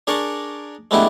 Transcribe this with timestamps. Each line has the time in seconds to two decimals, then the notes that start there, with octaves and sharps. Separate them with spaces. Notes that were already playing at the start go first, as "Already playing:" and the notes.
0.07 D4 G#4 A#4 D5 C#6
0.91 G#3 A3 B3 D4 E4 G4